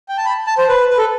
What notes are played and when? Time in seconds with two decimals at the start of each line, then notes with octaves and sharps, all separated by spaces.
0.09 G5
0.17 A5
0.26 B5
0.47 A5
0.58 C5
0.69 B4
0.90 B4
0.98 A4